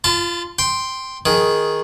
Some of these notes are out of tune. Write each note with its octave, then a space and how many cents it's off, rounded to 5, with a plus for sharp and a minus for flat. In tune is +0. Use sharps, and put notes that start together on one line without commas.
F4 -15 A5 +0 C6 -45
G5 +0 C6 +0
D#3 +10 G#4 +0